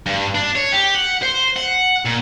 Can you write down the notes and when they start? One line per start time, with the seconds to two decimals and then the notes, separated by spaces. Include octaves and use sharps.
0.06 G2
0.35 D4
0.55 C#5
0.72 G4
0.95 F#5
1.22 C5
1.56 F#5
2.05 A#2